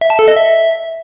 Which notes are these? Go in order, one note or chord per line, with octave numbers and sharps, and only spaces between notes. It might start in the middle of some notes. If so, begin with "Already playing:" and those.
E5
A5
A4
D#5
E5